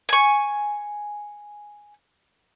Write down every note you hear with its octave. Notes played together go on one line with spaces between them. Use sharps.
G#5 C#6